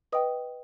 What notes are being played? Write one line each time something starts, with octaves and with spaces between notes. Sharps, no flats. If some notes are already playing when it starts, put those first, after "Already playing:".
B4 D#5 G5 D#6